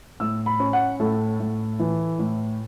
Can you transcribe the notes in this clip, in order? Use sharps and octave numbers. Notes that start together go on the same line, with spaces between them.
A2 E6
B5
C#4
F#5
A2 A4
A2
E3
A2